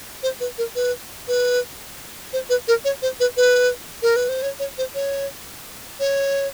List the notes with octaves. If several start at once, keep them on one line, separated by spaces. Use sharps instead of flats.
C5
B4
A#4
B4
B4
C5
B4
A#4
C#5
C5
B4
B4
A#4
B4
C5
C#5
C#5
C5
C#5
C#5